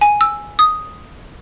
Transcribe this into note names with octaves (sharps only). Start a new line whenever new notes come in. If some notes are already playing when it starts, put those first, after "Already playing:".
G#5
E6
D#6